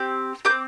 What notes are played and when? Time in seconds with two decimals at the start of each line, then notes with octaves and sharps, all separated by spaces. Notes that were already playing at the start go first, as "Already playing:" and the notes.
Already playing: C4 G4
0.45 G4 D6 G6
0.50 C4